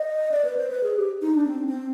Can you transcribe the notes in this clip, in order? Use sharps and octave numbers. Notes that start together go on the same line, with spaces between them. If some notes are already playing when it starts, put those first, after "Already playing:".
Already playing: D#5
D5
B4
C5
B4
G#4
G4
D#4
D4
C4
C4